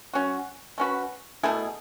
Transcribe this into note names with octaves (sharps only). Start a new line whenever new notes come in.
F#3 C#4 F#4
A3 C#4 F#4 B4
B2 A3 E4 G#4